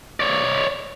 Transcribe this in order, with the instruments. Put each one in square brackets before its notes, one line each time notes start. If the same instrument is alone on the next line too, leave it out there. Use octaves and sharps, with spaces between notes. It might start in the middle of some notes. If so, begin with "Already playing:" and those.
[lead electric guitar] C#5 D5